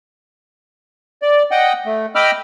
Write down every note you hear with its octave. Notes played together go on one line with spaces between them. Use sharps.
D5
D#5 F#5 G5
A3
D#5 G5 B5 D6 E6 F6